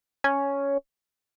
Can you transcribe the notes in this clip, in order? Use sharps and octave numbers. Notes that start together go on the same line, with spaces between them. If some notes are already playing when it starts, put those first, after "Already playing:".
C#4